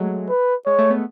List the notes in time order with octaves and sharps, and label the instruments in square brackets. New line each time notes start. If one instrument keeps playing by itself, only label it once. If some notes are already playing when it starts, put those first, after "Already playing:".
Already playing: [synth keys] F#3 G#3 A3
[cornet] B4
[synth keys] G#3 [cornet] C#5
[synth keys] A3
B3